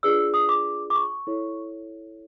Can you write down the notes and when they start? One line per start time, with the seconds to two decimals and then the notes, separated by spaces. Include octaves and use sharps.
0.03 D4 F4 G#4 B4 D5 E6
0.34 D#6
0.49 D6
0.90 D6
0.96 C#6
1.27 E4 A4 C#5